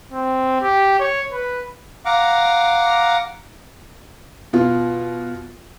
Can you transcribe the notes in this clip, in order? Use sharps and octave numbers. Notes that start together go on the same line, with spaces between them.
C4
G4
C#5
B4
F5 F#5 A#5 D6
B2 F4